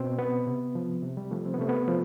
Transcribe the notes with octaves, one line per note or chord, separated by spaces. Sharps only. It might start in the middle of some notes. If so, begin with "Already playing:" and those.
Already playing: B2 C4
B3
C3
F3
C3
G3
F3 A3
C4
B3
C3 A3
B3
F3